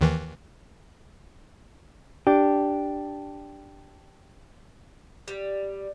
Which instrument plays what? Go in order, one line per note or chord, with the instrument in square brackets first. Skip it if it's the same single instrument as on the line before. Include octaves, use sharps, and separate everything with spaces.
[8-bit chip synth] D#2 D#3 E3
[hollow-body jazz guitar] D4 G4
[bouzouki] G3